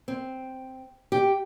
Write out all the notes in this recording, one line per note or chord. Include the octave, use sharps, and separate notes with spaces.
C4
G4